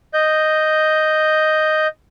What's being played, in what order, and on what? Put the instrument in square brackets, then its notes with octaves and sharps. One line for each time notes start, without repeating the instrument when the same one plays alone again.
[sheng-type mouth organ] D#5 G6